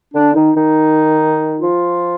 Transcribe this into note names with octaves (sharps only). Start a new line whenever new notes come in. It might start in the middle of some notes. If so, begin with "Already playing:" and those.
D3 D4
D#3 D#4
D#3 D#4
F3 F4